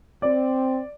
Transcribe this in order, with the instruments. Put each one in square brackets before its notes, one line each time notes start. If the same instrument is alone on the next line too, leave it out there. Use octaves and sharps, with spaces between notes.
[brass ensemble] C4 [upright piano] D5